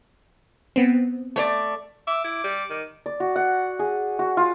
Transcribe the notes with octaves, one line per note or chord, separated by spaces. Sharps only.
B3 C4
A3 C#5 D5
E5 D6
E4
G3
D#3
D5
F#4
F#5
G#4
F#4
F4